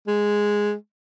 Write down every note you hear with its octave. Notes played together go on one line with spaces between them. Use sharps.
G#3